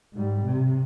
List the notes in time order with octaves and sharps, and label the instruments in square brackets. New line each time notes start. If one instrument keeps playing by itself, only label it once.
[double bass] G#2 G3
C3